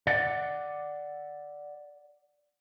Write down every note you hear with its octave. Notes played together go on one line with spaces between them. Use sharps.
D5 F#5